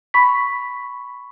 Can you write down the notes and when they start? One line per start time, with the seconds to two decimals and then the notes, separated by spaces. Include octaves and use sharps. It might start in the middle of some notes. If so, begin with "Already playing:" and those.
0.14 B5 C#6 B6